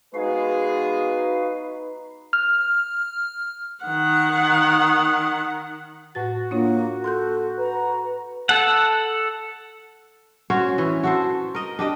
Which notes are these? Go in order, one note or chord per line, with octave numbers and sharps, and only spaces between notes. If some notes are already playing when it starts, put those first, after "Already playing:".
G#3 B3 D#4 F#4 G#4 B4 F5
F6
D#3 F#5
A2 F#4 B4 A6
A#3 D4 F4 C#5
A4 C6 F#6 G6
B4 A#5
A4 F#5
C#4 F#4 C5 C#5
E3
F#4 A4 C5
A#4 D#5
D4 G4 D#5